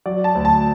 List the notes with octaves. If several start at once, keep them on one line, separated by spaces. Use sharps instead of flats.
F#3 D5
A5
D2
A5